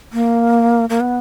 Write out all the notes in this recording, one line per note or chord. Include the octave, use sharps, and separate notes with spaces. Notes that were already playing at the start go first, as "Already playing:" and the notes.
A#3
A#3
B3